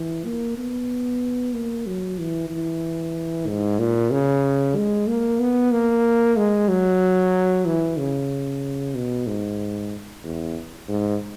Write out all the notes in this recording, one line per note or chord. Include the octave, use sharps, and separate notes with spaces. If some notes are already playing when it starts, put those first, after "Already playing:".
Already playing: E3
A#3
B3
A#3
F#3
E3
E3
G#2
A#2
C#3
G#3
A#3
B3
A#3
G#3
F#3
E3
C#3
B2
G#2
E2
G#2